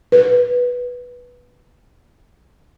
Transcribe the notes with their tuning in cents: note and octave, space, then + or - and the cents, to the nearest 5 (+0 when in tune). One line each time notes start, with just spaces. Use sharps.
B4 -5